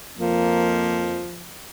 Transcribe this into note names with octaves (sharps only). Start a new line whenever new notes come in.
F2 F3 A#3